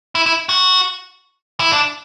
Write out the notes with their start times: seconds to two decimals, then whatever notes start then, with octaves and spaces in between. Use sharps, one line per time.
0.15 E4
0.26 E4
0.49 F#4
1.60 E4
1.72 D4